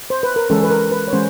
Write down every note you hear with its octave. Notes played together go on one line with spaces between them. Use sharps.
C5
B4
A#4
E3 G#3 C#4 A4
B4
A#4
B4
C#5
E3 G#3 C#4 C5